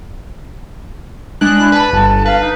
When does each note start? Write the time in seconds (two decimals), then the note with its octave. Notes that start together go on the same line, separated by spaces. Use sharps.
1.41 G#3 D4 F#6
1.58 E4
1.72 B4 A5 B5
1.93 G1 A5
2.26 B4 F5
2.40 D#4